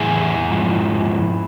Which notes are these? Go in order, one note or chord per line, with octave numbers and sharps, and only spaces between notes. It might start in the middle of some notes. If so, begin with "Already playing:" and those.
Already playing: A2 E3 E4 G#4
G#2 F3